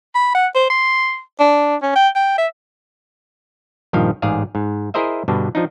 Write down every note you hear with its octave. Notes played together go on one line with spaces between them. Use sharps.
B5
F#5
C5
C6
D4
C#4
G5
G5
E5
A#1 G2 D#3 F3 F5
A1 G#2 G#4 D5 F5
G#2
E4 G#4 A#4 C5 D#5 E5
G2 B2 D3 D4
F3 D4 D#4